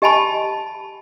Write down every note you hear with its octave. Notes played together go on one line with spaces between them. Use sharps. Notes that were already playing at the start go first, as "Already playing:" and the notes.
G4 D#5 G#5 A5 B5